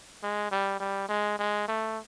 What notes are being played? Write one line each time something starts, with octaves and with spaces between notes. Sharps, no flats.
G#3
G3
G3
G#3
G#3
A3